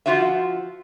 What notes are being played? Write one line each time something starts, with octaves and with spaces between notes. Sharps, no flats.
F3 B3 F4 F#4 C5 E5